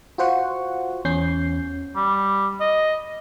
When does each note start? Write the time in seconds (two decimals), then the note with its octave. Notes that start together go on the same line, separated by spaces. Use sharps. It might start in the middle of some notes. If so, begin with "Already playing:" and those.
0.18 F4 F#4 C5 F#5 C#6
1.05 E2 C#4 G6 C7
1.96 G3
2.61 D#5